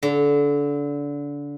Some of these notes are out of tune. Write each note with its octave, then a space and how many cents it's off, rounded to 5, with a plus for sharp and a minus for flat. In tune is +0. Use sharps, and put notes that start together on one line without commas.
D3 -25